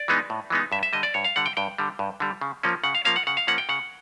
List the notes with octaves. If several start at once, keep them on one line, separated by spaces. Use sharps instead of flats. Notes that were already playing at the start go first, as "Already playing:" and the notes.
Already playing: D5
E3 G#3 B3 D#4
A2
E3 G#3 B3 D#4
G2 E5
E5
D3 G3 D#5
D5
G2 C#5
F5
D3 G3 F#5
G5
G2 G5
D3 G3
G2
D3 G3
C#3
F3 A#3 C#4
C#3 F#5
F5
F3 A#3 C#4 F5
F#5
C#3 F#5
F5
F3 A#3 C#4 F#5
G5
C#3 F#5